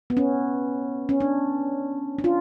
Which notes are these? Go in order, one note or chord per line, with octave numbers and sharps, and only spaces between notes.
B3
C#4
C#4
D4
D4
F4